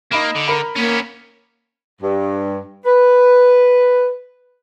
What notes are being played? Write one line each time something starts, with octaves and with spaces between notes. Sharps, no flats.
A#3 D#4 B5 E7
D3
A#4 B5
A#3 B3 C#4
G2
B4